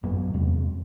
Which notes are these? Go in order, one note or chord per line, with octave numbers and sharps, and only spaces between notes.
A1 F#2 A#3 B3
E2 C3 G#3